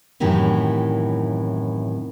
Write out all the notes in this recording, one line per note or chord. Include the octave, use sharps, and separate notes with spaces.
F#2 A2 C3 D#3 E3